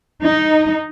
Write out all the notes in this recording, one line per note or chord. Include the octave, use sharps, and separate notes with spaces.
D#4